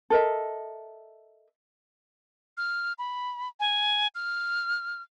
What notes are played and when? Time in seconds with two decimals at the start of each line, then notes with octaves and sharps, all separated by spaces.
0.10 A4 A#4 D#5 E5
2.57 F6
2.99 B5
3.60 G#5
4.15 F6